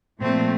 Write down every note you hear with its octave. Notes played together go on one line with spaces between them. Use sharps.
A#2 F3 A3 C4